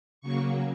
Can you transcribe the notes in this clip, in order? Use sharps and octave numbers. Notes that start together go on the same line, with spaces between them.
C#3 F#3 A#3 C#6